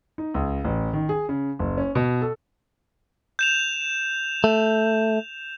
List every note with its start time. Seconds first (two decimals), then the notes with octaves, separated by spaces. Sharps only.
0.18 D#4
0.34 C#2
0.64 A1
0.93 D#3
1.09 G#4
1.29 C#3
1.59 F#1
1.78 C#4
1.95 B2
2.22 A4
3.39 G6 E7 F7
4.44 A3